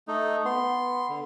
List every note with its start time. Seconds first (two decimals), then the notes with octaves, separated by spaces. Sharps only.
0.08 A3 D#4
0.46 B3 C6
1.09 D3